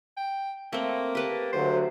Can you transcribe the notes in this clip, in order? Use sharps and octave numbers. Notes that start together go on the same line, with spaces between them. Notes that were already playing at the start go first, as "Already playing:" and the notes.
G5
A3 A#3 C4
G4 B4 A5
D2 D3 F#3 C5